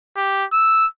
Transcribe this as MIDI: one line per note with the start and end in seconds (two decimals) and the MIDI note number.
0.16 0.45 67
0.53 0.86 88